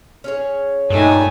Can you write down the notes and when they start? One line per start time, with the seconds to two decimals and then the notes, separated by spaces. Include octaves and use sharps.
0.24 C#4 G#4 C#5
0.90 A#1 G2 A3 D#4 G#5